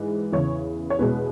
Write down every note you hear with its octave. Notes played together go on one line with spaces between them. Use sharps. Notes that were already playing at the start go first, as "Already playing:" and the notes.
Already playing: G#2 E3 G#3
E2 C#3 E3 C#5
C#5
E2 B2 G#3 B4